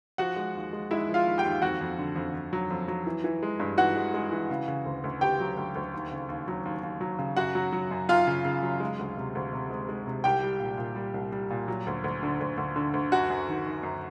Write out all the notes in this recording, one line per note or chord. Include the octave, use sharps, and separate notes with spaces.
F3 F#4 F#5
G#3
D#2
G#3
G#3 E4 E5
F3
F4 F5
D#2
G4 G5
D#2
F2 F#4 F#5
F2
D3
F2
F2
F#3
F2
F#3
E3
E3
G#3
G2
E3 F#4 F#5
G#3
G#3
E3
C#3
C#3
D2
D2
D2 G4 G5
F#3
D2
D2
D#2
C#3
D#2
F#3
D#2
D#2
F#3
C#3
F#2 F#4 F#5
F#3
F#3
F#2
F#2 F4 F5
C#3
C#3
F#3
G#3
D2
C3
D2
C3
G#3
G#3
C3
C2 G4 G5
G3
A#2
A#2
G3
C2
G3
A#2
F#3
D2
D2
D3
D2
D2
D3
D2
F#2 F#4 F#5
F#2
D#3
D#3
F#2